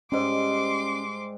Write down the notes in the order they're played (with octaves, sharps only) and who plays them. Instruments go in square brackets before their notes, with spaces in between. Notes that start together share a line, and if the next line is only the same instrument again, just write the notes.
[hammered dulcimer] G#2 G3 [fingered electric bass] C#4 [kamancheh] C6 D6